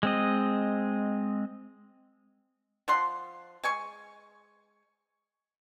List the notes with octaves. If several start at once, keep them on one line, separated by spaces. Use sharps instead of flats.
G#3 C4 D#5
F3 F#5 C6
G#3 G#5 C#6